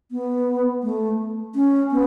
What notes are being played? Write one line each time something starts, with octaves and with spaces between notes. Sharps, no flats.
B3
A3
C#4
B3